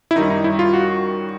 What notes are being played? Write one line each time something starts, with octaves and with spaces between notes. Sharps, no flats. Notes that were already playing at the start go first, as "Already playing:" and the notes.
E4
F#2 D#3 G3 D#4
D#4
E4
F4
F#4